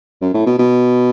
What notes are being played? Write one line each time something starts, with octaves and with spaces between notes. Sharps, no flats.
F#2
A2
B2
B2